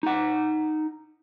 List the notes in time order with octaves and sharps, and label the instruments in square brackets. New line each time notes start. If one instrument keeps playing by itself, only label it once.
[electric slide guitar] D#4 F#5